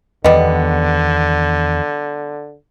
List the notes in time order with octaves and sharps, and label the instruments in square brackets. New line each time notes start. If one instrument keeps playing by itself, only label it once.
[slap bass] E2 D#3 [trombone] D3 [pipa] G3 B3 [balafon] D#5